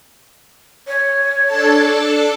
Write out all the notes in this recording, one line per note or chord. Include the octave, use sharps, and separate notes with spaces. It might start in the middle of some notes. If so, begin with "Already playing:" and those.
C#5
D4 A4 A5